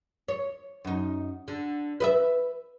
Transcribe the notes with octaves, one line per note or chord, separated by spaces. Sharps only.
C#5
F#2 D#4
D3
B4 D#5 E5